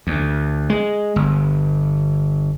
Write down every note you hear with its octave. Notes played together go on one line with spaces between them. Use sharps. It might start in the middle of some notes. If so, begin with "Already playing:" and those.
D2
G#3
G1